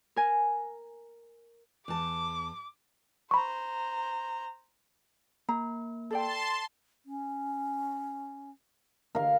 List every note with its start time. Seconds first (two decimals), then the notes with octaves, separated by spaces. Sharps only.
0.16 A#4 G#5
1.88 E2 A5 D6
3.31 C5 A#5 B5 C#6
5.49 A#3 A#5
6.10 A4 D5 G5 A5 C6
7.06 C#4
9.15 D3 A#4 F5